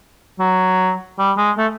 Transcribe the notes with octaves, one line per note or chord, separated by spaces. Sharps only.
F#3
G3
G#3
A3